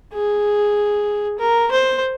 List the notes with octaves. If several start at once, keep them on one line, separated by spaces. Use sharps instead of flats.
G#4
A#4
C5